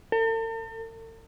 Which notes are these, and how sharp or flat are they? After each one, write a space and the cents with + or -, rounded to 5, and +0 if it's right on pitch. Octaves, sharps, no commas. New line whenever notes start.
A4 +45